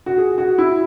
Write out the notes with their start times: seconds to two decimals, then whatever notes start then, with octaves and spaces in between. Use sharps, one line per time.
0.06 F#4
0.18 G#4
0.38 F#4
0.58 E4